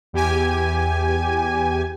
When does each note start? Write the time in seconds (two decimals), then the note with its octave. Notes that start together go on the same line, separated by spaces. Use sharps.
0.13 E2 G4 G#5